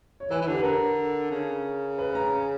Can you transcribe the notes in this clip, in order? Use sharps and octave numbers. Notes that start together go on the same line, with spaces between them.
C#5
E3 B4
E3
D3 G4
B4
D3 A#4
C#3
B4
A#5